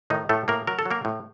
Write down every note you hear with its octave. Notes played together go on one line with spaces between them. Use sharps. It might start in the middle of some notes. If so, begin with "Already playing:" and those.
A2 D#3 D#4
A2 A3 A4
A2 A#3 A#4
F#3 A#4
A4
F#3
A#3 A#4
A2